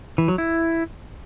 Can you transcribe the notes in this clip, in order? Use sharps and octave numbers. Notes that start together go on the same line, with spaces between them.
E3
F#3
E4